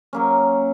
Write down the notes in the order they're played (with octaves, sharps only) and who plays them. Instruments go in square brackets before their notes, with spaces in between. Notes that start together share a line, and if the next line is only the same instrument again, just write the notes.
[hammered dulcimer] F#3 A#3 C#4